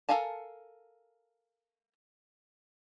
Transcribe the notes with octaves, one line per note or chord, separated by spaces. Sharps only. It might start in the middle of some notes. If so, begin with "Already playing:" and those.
A4 A#4 F5 G#5 A5